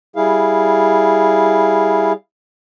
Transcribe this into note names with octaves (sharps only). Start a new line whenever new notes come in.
G3 E4 G#4 F5